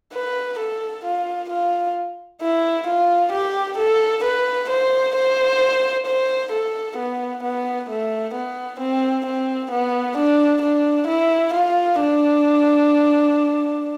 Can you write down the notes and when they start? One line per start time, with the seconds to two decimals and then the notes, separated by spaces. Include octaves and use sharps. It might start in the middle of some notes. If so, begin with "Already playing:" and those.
0.14 B4
0.59 A4
1.05 F4
1.50 F4
2.42 E4
2.88 F4
3.33 G4
3.78 A4
4.24 B4
4.70 C5
5.15 C5
6.07 C5
6.52 A4
6.98 B3
7.43 B3
7.90 A3
8.35 B3
8.80 C4
9.26 C4
9.72 B3
10.18 D4
10.62 D4
11.08 E4
11.54 F4
12.00 D4